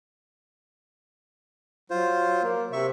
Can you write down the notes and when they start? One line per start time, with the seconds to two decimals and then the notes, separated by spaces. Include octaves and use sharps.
1.90 F#3 F4 C5
2.43 A#3
2.73 C3 E5 C#6